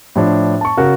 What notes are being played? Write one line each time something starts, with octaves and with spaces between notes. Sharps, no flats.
A2 F3 D4
A5 C#6
C#3 F#4 A#4